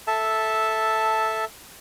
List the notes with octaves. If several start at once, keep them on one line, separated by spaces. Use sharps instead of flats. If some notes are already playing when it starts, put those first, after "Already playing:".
A4 E5 A5